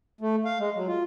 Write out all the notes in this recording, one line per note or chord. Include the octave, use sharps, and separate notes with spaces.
A3
F5
G#3
F#3
F4